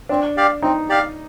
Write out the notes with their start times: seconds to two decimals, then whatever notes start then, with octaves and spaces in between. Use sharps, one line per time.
0.09 C4 D4
0.37 G4 D5 F5
0.62 C4 D#4
0.89 G4 D5 F5